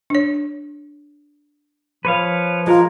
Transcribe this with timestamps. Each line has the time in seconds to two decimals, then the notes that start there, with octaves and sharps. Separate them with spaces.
0.10 D4 C#5
2.05 F3 B4 C#5 F5
2.67 G#3 F4 A#4